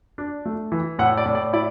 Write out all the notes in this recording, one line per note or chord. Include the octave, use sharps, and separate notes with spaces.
D4
A3
E3
A2 F#5
D5
A2
D5
E4 D5